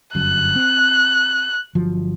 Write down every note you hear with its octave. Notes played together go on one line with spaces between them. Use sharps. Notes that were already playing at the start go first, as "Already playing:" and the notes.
G1 F#2 F#6
C4
G1 F3 F#3